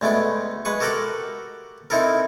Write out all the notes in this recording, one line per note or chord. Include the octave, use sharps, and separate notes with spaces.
D2 G#3 A3 B3 G5
G#3 B4 C#6
F#4 G4 A4 A#4 F#5 G5
C4 D#4 E4 A4 A#4